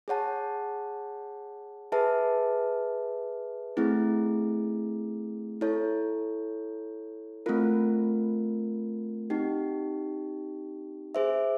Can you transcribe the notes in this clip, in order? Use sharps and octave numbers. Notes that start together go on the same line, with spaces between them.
G#4 C#5 F#5 A5
G#4 B4 E5 A5
A3 C4 E4 G#4
E4 A4 C#5
A3 C4 F4 A#4
C4 D#4 G4
G#4 C5 E5